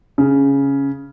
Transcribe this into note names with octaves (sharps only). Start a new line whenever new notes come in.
C#3